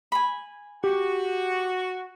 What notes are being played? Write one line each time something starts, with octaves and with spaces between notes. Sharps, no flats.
G#5 B5
F#4 G4